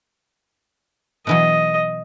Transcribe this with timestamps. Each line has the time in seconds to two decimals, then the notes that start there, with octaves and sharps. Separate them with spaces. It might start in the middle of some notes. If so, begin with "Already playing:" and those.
1.27 B2 E3 F#3 D#5